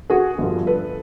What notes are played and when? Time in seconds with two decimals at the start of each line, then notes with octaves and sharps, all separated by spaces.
0.10 F#4 G#4
0.38 G1 G2 D3 F3
0.67 A4 B4